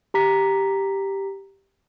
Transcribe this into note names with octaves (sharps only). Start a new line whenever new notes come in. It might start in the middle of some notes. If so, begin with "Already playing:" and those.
G4 A#5 B6